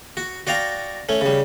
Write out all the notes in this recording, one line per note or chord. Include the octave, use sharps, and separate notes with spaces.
F#4
F#4 D5 F5 G5 A#5
A3 C#4
C#3 G3